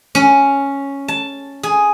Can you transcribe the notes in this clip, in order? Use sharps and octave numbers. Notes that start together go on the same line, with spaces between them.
C#4
A5
G#4